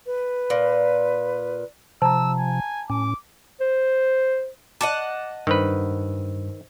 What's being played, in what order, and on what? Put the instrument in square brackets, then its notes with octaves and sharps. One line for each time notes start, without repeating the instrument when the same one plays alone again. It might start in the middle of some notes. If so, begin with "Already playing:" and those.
[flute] B4
[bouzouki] A#2
[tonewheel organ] C3 F3 [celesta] A5 A#5 [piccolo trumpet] E6
[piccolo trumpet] G#5
[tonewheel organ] A2 C#4 [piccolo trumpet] D6
[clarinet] C5
[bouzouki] D#5 F#5 A5 [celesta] D6 A6 C#7
[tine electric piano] G2 [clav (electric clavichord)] D#3 B4 [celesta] C5 E6